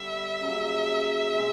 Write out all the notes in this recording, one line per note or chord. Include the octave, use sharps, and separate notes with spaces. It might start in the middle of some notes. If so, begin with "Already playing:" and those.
Already playing: D3 G3 B3 E5
C#3 F#3 A#3
B2 G#3 C4